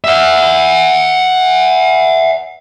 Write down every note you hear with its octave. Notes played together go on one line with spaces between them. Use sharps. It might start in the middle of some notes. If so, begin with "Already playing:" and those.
E5 F#5